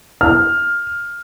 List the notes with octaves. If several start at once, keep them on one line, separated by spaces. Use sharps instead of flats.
F6